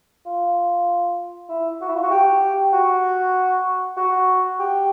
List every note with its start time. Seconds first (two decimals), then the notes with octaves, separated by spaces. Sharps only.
0.26 F4
1.49 E4
1.81 F#4
1.88 E4
1.96 F4
2.03 F#4
2.11 G4
2.73 F#4
3.97 F#4
4.59 G4